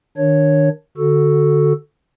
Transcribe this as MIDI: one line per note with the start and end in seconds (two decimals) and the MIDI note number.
0.17 0.69 51
0.17 0.69 62
0.17 0.69 73
0.97 1.73 50
0.97 1.73 66
0.97 1.73 69